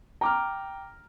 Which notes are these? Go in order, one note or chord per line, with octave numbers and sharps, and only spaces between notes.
G5 A#5 D6 F6